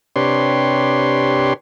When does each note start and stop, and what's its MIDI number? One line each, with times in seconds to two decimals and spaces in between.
0.16 1.53 48
0.16 1.53 62
0.16 1.53 67
0.16 1.53 71
0.16 1.53 73
0.16 1.53 84